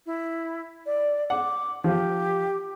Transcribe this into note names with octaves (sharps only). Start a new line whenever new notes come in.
E4
D5
F#5 D6
F3 G4